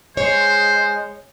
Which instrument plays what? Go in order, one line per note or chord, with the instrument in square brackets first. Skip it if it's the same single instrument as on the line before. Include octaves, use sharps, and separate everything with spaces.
[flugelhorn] G#3 [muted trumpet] C5 [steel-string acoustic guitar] C#5